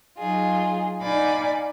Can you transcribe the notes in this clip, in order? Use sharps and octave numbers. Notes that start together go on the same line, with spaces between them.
F#3 D#4 F4 G#4
D#4 D5 F5 G#5 B5 D6